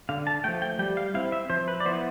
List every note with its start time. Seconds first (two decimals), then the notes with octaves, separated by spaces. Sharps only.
0.09 D3 F5
0.27 A5
0.44 F3 A3 G5
0.62 G5
0.79 G3 G5
0.97 F5
1.14 C4 E4 F5
1.32 E5
1.50 F3 C5
1.68 B4
1.80 D5
1.86 B3 E4 C5